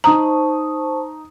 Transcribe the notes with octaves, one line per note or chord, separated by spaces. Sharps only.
D#4 C5 A5 A#5 C#6 D#6